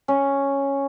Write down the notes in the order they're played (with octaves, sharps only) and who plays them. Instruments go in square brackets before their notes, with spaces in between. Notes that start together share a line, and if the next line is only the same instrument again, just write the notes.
[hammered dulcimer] C#4